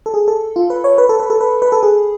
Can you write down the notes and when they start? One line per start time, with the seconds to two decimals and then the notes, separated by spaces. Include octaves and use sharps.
0.06 A4
0.14 G#4
0.28 A4
0.56 F4
0.70 B4
0.84 C#5
0.98 B4
1.09 A4
1.20 B4
1.30 A4
1.41 B4
1.62 B4
1.72 A4
1.83 G#4